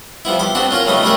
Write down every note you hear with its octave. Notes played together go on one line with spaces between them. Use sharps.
F3 G3 B3 E4
E2 G4 D6
B3 C4 D4 F#4 G4
C#4 F4 A#4 A#5
C#3 F#3 G3 A3 B3 D#4
G3 A3 G4 G#4 A#4 B4